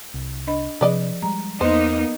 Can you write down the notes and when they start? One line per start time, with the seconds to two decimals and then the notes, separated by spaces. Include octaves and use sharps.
0.14 C2
0.47 D4 D#5 B5
0.81 C3 F3 G#4 B4 D5 D#5
1.22 G3 G#3 A#5
1.61 E2 A#3 B3 D#4 C5 D#5 C6